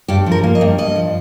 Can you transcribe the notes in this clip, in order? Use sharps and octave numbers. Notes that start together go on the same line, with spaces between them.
G2 G4
F3
A#4
A#3
D#5
G2
G2 D#5
F3